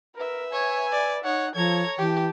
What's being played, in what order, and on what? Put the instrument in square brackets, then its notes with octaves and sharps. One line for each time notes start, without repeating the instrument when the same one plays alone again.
[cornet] A#4 [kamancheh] B4 E5
[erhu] C#5 [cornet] G#5
[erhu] D5
[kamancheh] D#4 [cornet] C#5 [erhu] F#5
[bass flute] F3 [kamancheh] A4 A#5 [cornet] C#5 [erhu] G#6
[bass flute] E3 [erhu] G4 [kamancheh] G5 A5